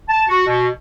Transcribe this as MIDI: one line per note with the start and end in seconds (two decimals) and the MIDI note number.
0.09 0.24 81
0.29 0.45 66
0.47 0.68 47